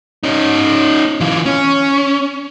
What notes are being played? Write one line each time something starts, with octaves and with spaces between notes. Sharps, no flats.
C#4 D#4
E3 F4
C#4